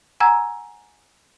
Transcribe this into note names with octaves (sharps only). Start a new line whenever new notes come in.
F#5 G#5 A#5 E6 G#6